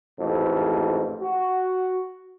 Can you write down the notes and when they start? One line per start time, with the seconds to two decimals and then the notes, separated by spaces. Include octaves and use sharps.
0.20 A1 F2 G#2
1.21 F#4